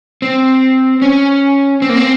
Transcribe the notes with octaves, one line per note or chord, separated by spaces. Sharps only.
C4
C#4
C4
A#3
C4